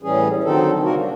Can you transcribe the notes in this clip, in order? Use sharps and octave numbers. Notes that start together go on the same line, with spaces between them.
A2 E3 G3 C#4 G#4
D3 D#3 F#3 C4 D#4 A4
C3 G3 A#3 F#4 A#4
D4